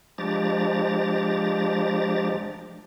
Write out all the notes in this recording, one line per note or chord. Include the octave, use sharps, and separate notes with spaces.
F3 G#3 D4 G4 A#5 A6